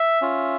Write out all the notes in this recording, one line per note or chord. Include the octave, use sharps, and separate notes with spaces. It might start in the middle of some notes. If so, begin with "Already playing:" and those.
Already playing: E5
C#4 F4